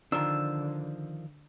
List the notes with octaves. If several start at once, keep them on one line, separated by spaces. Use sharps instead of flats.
D3 D#3 F3 D4 E6